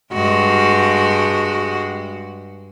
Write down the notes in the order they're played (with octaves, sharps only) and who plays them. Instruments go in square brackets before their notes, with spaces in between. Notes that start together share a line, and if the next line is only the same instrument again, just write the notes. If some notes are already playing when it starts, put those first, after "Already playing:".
[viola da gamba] G2 G#3 F#4